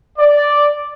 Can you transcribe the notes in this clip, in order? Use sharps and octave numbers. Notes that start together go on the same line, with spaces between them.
D5